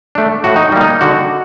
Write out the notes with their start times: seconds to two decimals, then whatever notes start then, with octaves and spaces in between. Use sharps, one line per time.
0.15 A3 D4
0.44 A2 F#4
0.56 D#4
0.72 G3 A#3
0.81 D#4
1.01 D3 F#4